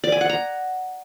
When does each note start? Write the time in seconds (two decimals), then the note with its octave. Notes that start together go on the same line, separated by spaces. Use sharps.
0.04 D5
0.12 G#5
0.21 F#5
0.29 A#5